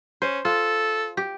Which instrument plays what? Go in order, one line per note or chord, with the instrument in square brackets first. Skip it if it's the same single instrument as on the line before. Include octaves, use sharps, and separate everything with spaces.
[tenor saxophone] C#4 [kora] C5
[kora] F4 [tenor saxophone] A4
[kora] G4